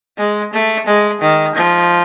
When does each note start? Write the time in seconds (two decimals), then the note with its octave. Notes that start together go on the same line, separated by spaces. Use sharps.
0.18 G#3
0.53 A3
0.86 G#3
1.21 D#3
1.55 F3